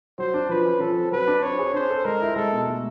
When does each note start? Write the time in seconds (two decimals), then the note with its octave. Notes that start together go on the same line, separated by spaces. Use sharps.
0.18 F#3 C5
0.34 D4
0.49 F3 B4
0.65 C#4
0.80 F3 A4
0.96 C4
1.12 F#3 B4
1.27 D4
1.43 C4 C#5
1.59 G#4
1.74 D4 C5
1.90 A4
2.05 G#3 A#4
2.21 E4
2.36 G#3 A4
2.52 B2
2.67 A3